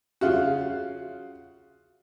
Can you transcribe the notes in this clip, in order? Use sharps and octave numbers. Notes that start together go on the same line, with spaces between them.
C#3 F4 F#4